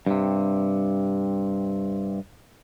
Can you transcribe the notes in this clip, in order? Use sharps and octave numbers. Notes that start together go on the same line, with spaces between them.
G2 C3